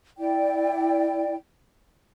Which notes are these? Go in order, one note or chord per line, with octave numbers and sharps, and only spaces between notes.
E4 D5 G5